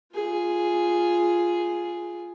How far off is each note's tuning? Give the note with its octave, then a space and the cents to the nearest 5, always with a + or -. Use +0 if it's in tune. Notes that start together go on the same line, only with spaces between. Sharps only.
F4 -5 G#4 +0